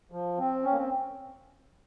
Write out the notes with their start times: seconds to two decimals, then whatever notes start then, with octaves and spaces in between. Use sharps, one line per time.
0.12 F3
0.38 C4
0.64 C#4
0.72 A#3
0.76 C4